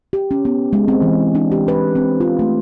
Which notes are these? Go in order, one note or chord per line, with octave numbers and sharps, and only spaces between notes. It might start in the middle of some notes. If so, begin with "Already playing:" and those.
G4
C#4
B3
G#3
C4
E3
D4
G4
B4
C4
F4
A3